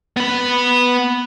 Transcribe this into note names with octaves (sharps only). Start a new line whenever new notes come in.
B3 B5